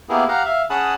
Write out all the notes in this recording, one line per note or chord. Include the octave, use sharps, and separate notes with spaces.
A#3 B3 E4 G4 G#4
G4 F5 F#5 A#5
E5 F5
C#4 G#4 F#5 A5 B5 D#6